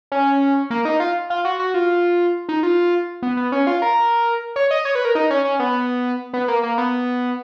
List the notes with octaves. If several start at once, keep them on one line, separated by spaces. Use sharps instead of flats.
C#4
A#3
D#4
F4
F4
F#4
F#4
F4
D#4
F4
B3
B3
C#4
F4
A#4
C#5
D#5
C#5
B4
A#4
D#4
C#4
C#4
B3
B3
A#3
A#3
B3